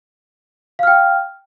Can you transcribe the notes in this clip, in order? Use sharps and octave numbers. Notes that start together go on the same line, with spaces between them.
F5 G5 F6